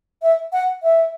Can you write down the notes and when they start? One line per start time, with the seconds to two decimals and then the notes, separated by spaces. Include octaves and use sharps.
0.22 E5
0.53 F#5
0.83 E5